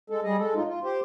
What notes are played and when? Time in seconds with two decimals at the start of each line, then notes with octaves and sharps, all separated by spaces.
0.10 G#3 A4
0.24 G3 G#4 D#5
0.38 G#3 A4
0.55 A2 D#4 F4
0.67 F4
0.84 G4 C5